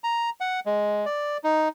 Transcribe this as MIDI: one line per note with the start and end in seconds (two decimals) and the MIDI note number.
0.04 0.30 82
0.40 0.60 78
0.66 1.05 56
1.06 1.37 74
1.44 1.68 63